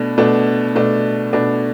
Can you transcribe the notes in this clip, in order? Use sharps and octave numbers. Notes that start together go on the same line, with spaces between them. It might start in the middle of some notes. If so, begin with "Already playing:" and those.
Already playing: B2 A3 D4
B2 A3 D4
B2 A3 D4
B2 A3 D4